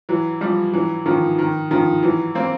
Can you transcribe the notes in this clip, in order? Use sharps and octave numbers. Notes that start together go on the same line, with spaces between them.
E3 F#3
F3 G3
E3 F#3
D#3 F3
D#3
D#3 F3
E3 F#3
A#3 C4